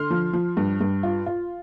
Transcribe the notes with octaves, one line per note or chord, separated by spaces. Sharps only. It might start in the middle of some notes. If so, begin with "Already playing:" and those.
Already playing: D3 C6 F6
F3
F3
G2
G2
F4
F4